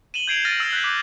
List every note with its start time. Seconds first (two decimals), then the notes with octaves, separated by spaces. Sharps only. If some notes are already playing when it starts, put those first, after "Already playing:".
0.14 D#7 E7 F#7 G7
0.28 G6 G#6 C7 D7 F7
0.45 F6 A6 A#6 D#7 E7
0.60 E6 C7 F#7
0.73 F#6 G6 B6
0.84 D6